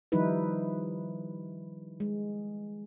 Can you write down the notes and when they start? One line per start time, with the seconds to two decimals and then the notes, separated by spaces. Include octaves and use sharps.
0.12 D#3 F3 G3 D#4 E4 B4
2.00 G#3